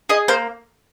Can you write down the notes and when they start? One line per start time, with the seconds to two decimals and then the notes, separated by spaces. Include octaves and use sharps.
0.09 G#4 D#5
0.28 A#3 C5